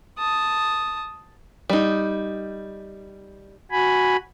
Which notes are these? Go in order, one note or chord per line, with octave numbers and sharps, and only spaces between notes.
A5 D#6
G3 D#4
F#4 G#5 B5